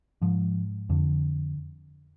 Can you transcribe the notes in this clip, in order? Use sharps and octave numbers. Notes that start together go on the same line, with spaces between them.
G#2 F3
F2 D3